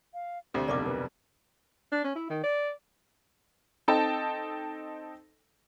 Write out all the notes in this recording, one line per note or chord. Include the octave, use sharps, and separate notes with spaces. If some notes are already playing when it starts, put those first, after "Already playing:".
F5
D2 C3 C5
F1 B1 A#4 D5 D#5 D6
A#4 B4
D4
C#4
E4
D#3
D5
C4 D#4 A4 G5 A5